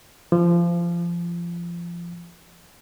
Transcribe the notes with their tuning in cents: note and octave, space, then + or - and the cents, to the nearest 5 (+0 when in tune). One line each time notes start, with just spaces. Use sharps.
F3 -25